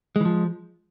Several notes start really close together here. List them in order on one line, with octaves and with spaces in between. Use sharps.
G#3 E3 F3